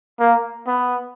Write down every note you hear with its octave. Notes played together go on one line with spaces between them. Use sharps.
A#3
B3